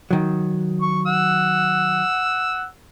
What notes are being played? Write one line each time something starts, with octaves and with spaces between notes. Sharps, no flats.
D#3 F#3
C#6
F#5 E6